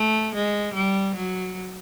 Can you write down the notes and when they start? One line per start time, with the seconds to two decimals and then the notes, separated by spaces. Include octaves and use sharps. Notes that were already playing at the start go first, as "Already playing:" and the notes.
Already playing: A3
0.35 G#3
0.74 G3
1.15 F#3